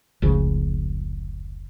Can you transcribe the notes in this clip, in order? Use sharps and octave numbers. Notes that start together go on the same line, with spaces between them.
F1 C#2 C#3 F3